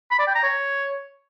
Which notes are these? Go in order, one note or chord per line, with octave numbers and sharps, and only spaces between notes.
B5
D5
G5
A#5
C#5